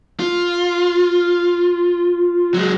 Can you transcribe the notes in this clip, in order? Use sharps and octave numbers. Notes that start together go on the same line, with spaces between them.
F4
F#3 G#3